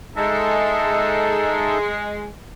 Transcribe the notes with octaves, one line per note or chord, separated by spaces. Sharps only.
G#3 D#4 A4 E5